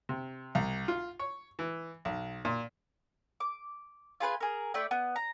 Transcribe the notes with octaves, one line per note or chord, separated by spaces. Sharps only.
C3
C2
F4
C#5
E3
B1
A#2
D6
F4 G#4 B4 G#5
G#4 A#4
A3 E4 D5 G5
B3
A#5